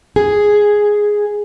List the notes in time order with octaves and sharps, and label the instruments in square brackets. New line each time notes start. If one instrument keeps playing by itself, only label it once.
[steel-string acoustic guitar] G#4